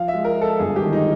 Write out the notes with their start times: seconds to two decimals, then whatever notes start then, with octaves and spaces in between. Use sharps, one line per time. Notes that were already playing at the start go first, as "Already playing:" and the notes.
Already playing: F3 F5
0.08 E5
0.13 G#3
0.24 A#4
0.36 G#3
0.41 A4
0.59 G1 G#4
0.76 G4
0.81 D#3
0.93 D#4